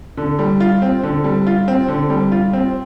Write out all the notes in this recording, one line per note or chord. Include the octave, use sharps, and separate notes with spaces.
D3
G3
F4
C4
D3
G3
F4
C4
D3
G3
F4
C4